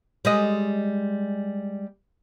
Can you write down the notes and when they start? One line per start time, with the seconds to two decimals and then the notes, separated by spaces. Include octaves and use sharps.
0.25 G3 G#3 D#5